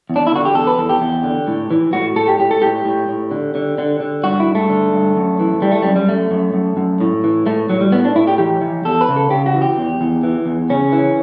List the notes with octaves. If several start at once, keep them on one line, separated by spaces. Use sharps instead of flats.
E2
D4
E4
D3 F#4
G4
E2 A4
B4
E2 A4
G4
E2
D3
A2
E3
A2 F#4
A2 A4
G4
A2 G4
A4
A2 G4
A2
A2
D3
D3
D3
D3
G2 F#4
E4
G2
A3
D3
G2
F#2
E3
E3 G3
A3
F#2 G3
G3
F#2 A3
F#2
F#2
F#2
A2
E3
A2 A3
A2 F#3
G3
A2 B3
D4
A2 E4
G4
E3 G4
E3
E2 A4
B4
C#3
A4
C#3 G4
F#4
E3
G4
E2
E2
E3
E2
C#3 C#4
E3